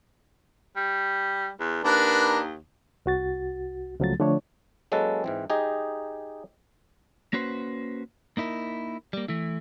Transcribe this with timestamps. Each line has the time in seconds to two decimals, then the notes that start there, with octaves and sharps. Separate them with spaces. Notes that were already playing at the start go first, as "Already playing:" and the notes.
0.77 G3
1.60 E2
1.84 D#2 D4 A#4 B4
3.06 C2 F#4 A6
4.00 C#2 C#3 F3 F#3 A3 A6
4.20 D3 F3 A3 D4 C#5
4.92 F#3 G#3 A#3 C#4 A4 B4
5.24 G#2 E3 C4
5.50 D#4 G4 G#4 D#5
7.33 A#3 C#4 F#4 B4 C5
8.37 A#3 D#4 E4 A#4
9.13 G3 A#3
9.28 E3 A3 E4